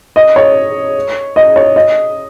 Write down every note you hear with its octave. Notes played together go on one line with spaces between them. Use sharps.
D#5
C#5
D#5
C#5
D#5